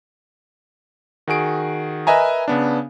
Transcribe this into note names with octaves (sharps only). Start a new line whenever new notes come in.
D#3 F#4 G#4 D7
A#4 B4 D#5 E5 G#5 A#5
C#3 B3 D4